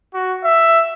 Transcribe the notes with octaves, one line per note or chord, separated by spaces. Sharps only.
F#4
E5